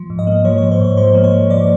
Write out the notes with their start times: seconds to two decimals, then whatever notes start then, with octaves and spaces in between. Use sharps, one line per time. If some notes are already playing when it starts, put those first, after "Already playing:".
Already playing: F3
0.10 G#2
0.19 D#5
0.27 A#3
0.45 F3 C#5
0.58 C#5
0.63 G#2
0.72 C5
0.80 G#2 C#5
0.97 F3 C5
1.15 A#3
1.24 C#5
1.33 F3
1.50 F3 D5